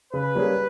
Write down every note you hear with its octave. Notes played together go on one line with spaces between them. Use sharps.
C#3 B4
G3 A#3 C#4 G#4